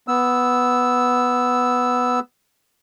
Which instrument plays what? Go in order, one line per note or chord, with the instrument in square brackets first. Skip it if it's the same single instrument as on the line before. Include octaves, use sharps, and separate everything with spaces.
[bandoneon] B3 E6